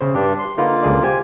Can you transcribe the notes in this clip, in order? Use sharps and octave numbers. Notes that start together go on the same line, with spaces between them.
C#3 C5
G2 D4 G4
C6
D3 A#3 D#4 F4 A#4 B4
C#2 G#4 D5
G4 C5 G#5